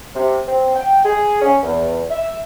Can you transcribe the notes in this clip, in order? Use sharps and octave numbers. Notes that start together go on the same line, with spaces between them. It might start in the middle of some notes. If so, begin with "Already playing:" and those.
C3
C4
G5
G#4
C#4
E2
E5